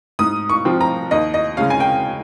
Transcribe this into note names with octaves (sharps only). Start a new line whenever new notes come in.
G#2 D#6
C#6
F3 C4 F4
A#5
D#2 D#5
D#5
C#3 G#3 C#4 F5
G#5
G5